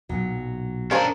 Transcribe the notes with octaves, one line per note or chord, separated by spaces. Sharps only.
B1 A#2 F#3
C#4 D4 A#4 C5 F5